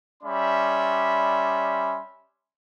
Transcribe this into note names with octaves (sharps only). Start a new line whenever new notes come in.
G3 C#4 D5 E5 B5 C6